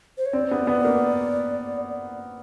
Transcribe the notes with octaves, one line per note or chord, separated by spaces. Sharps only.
C5
C#5
C4 D5
B3
B3
A#3